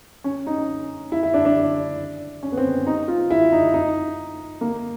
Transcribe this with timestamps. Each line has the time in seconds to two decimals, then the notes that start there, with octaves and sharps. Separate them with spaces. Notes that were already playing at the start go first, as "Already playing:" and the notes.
0.24 C#4
0.47 D#4
1.12 E4
1.23 E4
1.34 D4
1.45 D4
2.43 C#4
2.52 B3
2.58 C4
2.87 D#4
3.08 F4
3.30 E4
3.52 D#4
3.74 D#4
4.61 A#3